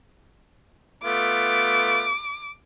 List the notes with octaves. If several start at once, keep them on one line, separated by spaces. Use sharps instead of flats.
A3 B3 F4 D6